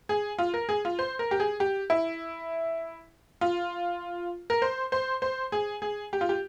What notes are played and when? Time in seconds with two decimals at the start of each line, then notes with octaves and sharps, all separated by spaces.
0.09 G#4
0.38 F4
0.54 A#4
0.69 G#4
0.85 F4
0.99 C5
1.19 A#4
1.31 G4
1.40 G#4
1.60 G4
1.90 E4
3.41 F4
4.50 A#4
4.62 C5
4.92 C5
5.22 C5
5.52 G#4
5.82 G#4
6.13 G4
6.21 F4
6.29 G4